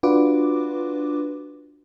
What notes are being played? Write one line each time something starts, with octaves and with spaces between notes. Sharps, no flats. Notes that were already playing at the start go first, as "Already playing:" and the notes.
D4 F4 F#4 B4 D6